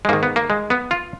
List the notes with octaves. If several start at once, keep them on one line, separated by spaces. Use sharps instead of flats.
G#3
G#2 D#3 A#3
B3
A#3
G#3
B3
F4